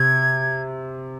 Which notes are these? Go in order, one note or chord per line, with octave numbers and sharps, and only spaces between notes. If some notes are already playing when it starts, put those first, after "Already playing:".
Already playing: C3 G#6